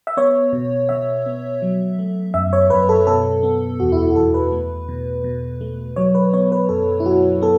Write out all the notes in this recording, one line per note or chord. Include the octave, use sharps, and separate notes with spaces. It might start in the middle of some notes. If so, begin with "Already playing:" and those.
E5
B3 C#5
B2
B2 E5
B3
F#3
A3
F#2 E5
C#5
F#2 B4
A4
B2 A4
B3
E2 F#4
E4
F#4
F#4
E2 A4
B4
A3
B2
B2
A3
F#3 C#5
B4
B3 C#5
B4
F#2 A4
E4
F#2 F#4
B3 A4